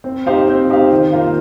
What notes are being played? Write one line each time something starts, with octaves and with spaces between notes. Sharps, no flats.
C4
D#4 G4 C5 F5
C4
D#4 G4 C5 F5
D#3
A#3 F4 C5 F5